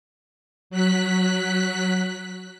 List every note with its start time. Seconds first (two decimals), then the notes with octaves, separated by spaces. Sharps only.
0.70 F#3 F#6 B6